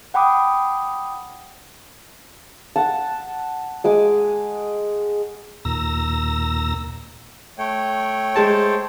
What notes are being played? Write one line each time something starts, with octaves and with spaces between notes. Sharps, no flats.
F#5 G5 B5 D6 D#6
F#5 A5
G#3 G#5 D6
D#2 A#2 A#5 E6 A#6
A3 C#5 G5
G#3 C5 A5